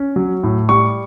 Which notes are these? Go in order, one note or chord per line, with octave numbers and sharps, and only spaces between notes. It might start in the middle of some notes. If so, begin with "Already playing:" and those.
Already playing: C#4
F#3
A2
G3 C#6